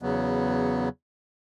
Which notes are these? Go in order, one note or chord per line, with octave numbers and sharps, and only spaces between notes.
E2 C#3 F#3 B3